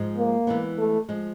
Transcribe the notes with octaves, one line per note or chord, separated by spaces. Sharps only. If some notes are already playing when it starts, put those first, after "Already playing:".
Already playing: G#2 F3 G#3
A#3
E3 G#3 B3
A3
F3 G#3